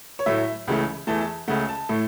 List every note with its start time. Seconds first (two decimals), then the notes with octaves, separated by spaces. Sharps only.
0.19 C#5
0.26 A2 F#3 A3 E5
0.68 C#2 C#3 E3 A3
1.07 E2 E3 A3 A5
1.21 A5
1.48 C#2 C#3 A3 F#5
1.69 A5
1.89 A2 A3